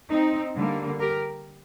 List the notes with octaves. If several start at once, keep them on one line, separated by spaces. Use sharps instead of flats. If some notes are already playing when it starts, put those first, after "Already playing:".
C4 D#4
D3 G3 A#3
G4 A#4